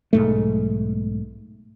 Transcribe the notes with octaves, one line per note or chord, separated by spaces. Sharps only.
B1 G#2 A3